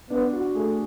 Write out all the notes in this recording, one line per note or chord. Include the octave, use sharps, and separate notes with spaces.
B3 D4
F#4
A3 G#4